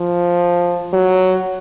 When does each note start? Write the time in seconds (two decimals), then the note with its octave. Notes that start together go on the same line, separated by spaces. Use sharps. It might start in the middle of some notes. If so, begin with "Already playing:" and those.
Already playing: F3
0.93 F#3